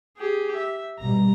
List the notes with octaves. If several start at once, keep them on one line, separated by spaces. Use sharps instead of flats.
G4 G#4
E5
G#1 B2 G3 A#5